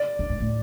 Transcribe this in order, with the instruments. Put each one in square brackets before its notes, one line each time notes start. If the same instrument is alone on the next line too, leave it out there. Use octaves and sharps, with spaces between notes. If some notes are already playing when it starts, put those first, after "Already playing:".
Already playing: [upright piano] D5
[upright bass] G2
G#2
A2